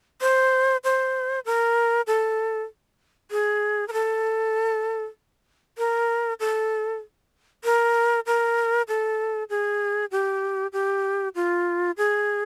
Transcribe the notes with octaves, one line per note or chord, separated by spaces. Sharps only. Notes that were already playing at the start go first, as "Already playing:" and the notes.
C5
C5
A#4
A4
G#4
A#4
A4
A#4
A4
A#4
A#4
A4
G#4
G4
G4
F4
G#4